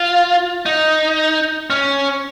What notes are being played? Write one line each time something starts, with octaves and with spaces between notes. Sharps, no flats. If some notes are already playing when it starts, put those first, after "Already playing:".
Already playing: F4
D#4
C#4